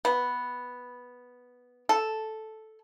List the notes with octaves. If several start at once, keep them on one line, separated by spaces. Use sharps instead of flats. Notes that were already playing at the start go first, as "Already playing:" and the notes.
B3
A4